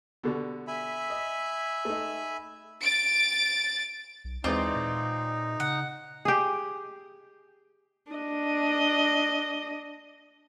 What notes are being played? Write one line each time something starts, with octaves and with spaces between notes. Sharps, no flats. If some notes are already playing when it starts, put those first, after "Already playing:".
B2 D3 G3
E5 G#5 B5
D#5
A3 D#4
A6 D7
B1
D#2 E3 G#3 C4 D#4 F4 D5
A#2
C#3 F#5
G4 G#4
D4 D#5